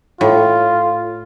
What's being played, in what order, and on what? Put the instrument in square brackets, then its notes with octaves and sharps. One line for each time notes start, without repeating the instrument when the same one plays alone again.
[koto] A2 [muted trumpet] F4